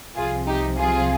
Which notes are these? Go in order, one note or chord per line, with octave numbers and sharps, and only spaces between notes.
C2 C3 F3 F4 G#4
D#4 G4
F4 G#4